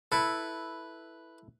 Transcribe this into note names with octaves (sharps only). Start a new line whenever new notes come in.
E4 A4 B4